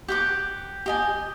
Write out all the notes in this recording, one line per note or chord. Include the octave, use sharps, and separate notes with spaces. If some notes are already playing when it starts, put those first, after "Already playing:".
G4 F#5 D6
G4 D#5 G#5